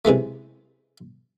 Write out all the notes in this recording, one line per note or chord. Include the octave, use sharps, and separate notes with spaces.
C3 E3 G#3 A3